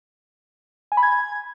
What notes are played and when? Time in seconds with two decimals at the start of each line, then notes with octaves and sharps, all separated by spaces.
0.92 G#5
0.97 B5
1.03 G#6